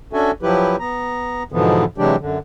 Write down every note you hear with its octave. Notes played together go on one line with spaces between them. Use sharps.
C#4 D4 F#4 A4 E5 G#5
F3 F#3 E4 G4 B4
B3 A#5
G#2 B2 D3 E3 F3 B3
C3 E3 F#3 G#3 D4 G4
F#2 D3